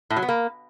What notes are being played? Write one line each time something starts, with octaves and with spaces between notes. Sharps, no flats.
A2
F#3
B3
A#3